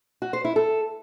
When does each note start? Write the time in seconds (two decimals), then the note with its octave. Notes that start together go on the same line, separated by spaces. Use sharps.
0.22 F#4
0.33 C5
0.45 E4
0.56 A4